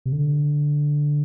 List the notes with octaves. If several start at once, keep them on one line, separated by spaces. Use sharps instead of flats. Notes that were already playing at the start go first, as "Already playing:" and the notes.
C3
D3